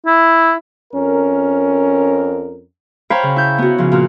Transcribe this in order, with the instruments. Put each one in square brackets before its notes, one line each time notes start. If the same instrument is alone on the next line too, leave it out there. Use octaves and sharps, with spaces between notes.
[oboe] E4
[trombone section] F2 C#4 A#4
[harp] C5 C#5 F5 G5 A#5 B5
C#3
E4 G6
B3 F#4
C#3 F3
A#2 F4 F#4 F6